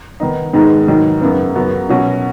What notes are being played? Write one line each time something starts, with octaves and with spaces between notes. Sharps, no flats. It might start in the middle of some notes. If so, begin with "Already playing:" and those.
D#3 B3 D#4
G#2 D#3 G#3 B3 D#4
G#2 D#3 F#3 D#4
F#2 C#3 B3
F#2 C#3 B3 F#4
B2 F#3 C#4 F#4